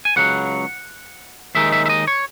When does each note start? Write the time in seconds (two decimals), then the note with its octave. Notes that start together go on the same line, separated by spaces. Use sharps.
0.05 G#5
0.16 C#2 C#3 F#3 F#5
1.55 D#2 D#3 G#3 D#4 E5
1.72 E5
1.86 E5
1.90 D#5
2.08 C#5